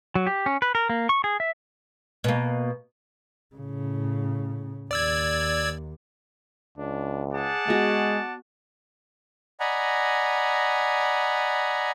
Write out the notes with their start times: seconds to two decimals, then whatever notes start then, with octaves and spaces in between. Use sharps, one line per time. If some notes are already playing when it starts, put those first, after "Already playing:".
0.15 F#3
0.27 G4
0.46 C#4
0.62 B4
0.75 A#4
0.90 A#3
1.09 C#6
1.24 G#4
1.40 E5
2.24 B2 A#3
3.56 A2 C#3
4.91 D#2 D5 E6 G#6
6.78 C#2 D4
7.34 G#4 D5 F#5 A5
7.68 G#3 B3 F#4
9.60 D5 D#5 F#5 G#5 A#5 B5